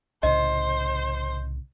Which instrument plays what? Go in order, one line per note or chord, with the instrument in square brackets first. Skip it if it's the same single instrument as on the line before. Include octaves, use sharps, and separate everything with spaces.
[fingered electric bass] C2 A2 C#3 [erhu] C5 [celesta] D#5